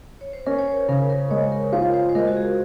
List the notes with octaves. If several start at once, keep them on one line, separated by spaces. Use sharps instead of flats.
C#5
C5
C#4 A#4
C#5
C5
C#3 A#4
A#4
G#3 C#5
A#4
F4 C5
C5
C5
G#3 A#4
F#4
G#4